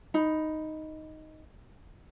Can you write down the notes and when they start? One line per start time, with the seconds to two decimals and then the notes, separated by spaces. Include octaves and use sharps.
0.14 D#4 B5